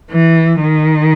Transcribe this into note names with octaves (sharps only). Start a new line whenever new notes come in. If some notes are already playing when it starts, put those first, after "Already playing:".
E3
D#3